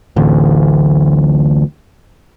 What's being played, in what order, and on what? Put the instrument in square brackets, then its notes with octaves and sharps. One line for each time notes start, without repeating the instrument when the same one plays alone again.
[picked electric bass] D1 A1 D2